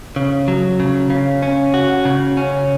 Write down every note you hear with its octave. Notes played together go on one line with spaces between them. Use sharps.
C#3
F#3
C#3
C#3
C#4
F#4
C#3
C#4